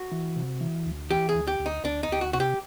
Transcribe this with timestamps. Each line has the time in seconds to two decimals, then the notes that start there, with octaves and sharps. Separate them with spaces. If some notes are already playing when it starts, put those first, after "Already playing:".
Already playing: F#4
0.12 E3
0.36 C3
0.61 E3
0.86 D2
1.10 E3 G4
1.29 G#4
1.35 D2
1.47 G4
1.60 D2
1.66 D#4
1.84 D2 D4
2.03 D#4
2.09 D2 G4
2.21 F#4
2.33 C3 F#4
2.40 G4